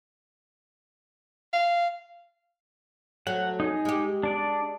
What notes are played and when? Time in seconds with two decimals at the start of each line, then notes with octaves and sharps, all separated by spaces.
1.53 F5
3.27 F#3 A3 F#5
3.60 D#4 G#4
3.85 G#3 G4
4.23 D4 D5